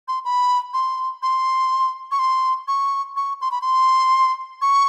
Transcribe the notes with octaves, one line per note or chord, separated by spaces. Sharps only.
C6
B5
C6
C6
C#6
C6
C#6
C#6
C6
B5
C6
C#6